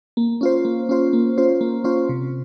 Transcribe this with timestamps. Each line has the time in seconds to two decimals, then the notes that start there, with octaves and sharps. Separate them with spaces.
0.17 A#3
0.41 C#4 F4 C5
0.65 A#3
0.89 C#4 F4 C5
1.13 A#3
1.37 C#4 F4 C5
1.61 A#3
1.84 C#4 F4 C5
2.09 C3